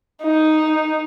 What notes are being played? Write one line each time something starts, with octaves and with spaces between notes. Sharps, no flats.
D#4